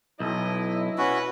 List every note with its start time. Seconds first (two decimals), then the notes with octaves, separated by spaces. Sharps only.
0.20 B1 E4 D#5
0.98 C#4 F#4 B4